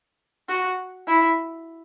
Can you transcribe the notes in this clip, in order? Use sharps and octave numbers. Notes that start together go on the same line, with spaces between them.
F#4
E4